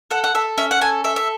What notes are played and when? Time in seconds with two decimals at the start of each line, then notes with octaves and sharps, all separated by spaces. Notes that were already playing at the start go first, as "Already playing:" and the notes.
0.11 A4 F#5
0.24 F#5
0.34 A4 E5
0.58 C#4 E5
0.71 F#5
0.81 A4 G#5
1.04 A4 E5
1.16 E5